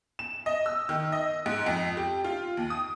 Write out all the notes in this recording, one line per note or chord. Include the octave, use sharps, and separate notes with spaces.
E7
D#5
E6
D#3
D#5
G#2
F2
G4
F4
D#2
D#6